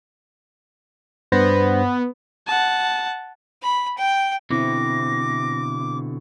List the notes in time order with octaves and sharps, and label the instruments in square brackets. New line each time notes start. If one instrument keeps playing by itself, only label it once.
[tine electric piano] G2 C5 A#6 [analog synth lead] B3
[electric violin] F#5 A5
[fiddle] B5
G5
[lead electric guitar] B2 D3 [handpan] C4 E4 [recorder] D6 [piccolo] A#6